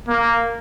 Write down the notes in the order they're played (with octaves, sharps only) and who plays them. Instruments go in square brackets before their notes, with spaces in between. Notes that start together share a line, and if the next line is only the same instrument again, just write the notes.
[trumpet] A#3